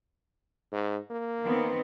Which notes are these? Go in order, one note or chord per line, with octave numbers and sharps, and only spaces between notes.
G#2
A#3
D#3 B3 C4